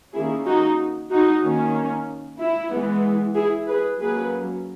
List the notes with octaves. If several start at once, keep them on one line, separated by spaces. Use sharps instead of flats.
D#3 A#3 C#4 E4 G#4
D#4 F#4
D#4 F#4
D#3 A#3 C#4
E4
E3 G#3 B3
E4 G#4
G#4 B4
F#3 A#3 C#4 G#4 B4